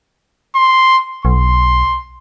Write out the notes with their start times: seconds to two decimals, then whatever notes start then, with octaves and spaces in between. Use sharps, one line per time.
0.56 C6
1.25 B1 C6